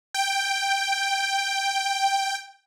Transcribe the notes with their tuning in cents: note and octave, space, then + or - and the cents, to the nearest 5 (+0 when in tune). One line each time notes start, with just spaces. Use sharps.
G5 +5